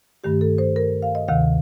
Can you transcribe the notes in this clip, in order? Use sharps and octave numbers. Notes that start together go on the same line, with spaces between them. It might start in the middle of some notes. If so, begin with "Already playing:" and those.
G2 D#3 A3 G4
A4
C5
A#4
F5
D#5
D2 C3 D#3 F5